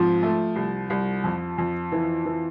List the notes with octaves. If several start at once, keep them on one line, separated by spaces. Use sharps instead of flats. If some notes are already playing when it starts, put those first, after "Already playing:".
Already playing: G#2 F3 C4
A3
C2
C2
F2
F2
E3
E3